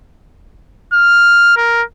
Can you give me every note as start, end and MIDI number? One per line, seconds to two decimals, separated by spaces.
0.94 1.55 89
1.57 1.83 70